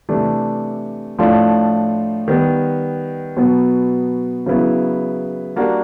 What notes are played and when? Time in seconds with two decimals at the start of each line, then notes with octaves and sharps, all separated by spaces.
0.09 C3 E3 A3 D4
1.19 A2 F3 A3 D4 F4
2.28 D#3 G3 B3
3.36 B2 F#3 B3
4.46 C#3 F#3 B3 E4
5.56 G3 A#3 D4 F#4